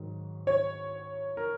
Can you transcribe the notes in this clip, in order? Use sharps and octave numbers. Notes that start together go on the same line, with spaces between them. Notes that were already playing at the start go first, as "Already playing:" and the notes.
Already playing: G#2 D#3 F#3
C#5
A#4